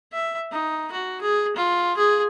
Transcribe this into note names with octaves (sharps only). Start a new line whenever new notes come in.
E5
D#4
F#4
G#4
F4
G#4